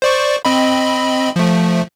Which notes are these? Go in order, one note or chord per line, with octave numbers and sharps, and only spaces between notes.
C5 D5 C#6
C4 D#5 B5
F3 A3